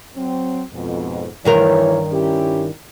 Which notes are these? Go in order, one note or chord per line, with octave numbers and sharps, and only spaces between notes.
F#3 C4
F2 G#2 B2
G2 D#3 E3 A#4 C#5
C#4 E4 G4